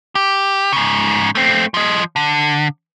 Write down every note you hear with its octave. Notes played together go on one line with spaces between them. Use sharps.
G4
G#2 C#3
A3 C4
F3 D#5
D3